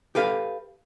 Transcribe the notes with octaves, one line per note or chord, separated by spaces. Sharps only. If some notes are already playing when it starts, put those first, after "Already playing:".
G4 A4 B4 F5